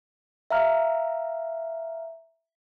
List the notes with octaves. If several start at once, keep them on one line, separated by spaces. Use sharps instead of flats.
E5 F5 A#5 F6